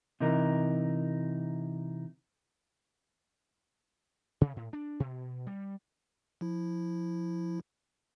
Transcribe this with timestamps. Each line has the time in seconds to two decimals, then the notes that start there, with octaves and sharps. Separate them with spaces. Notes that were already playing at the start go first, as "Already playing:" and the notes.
0.20 C3 E3 D#4 A#4
4.41 C3
4.56 A2
4.73 D4
5.00 B2
5.47 G3
6.41 F3 E4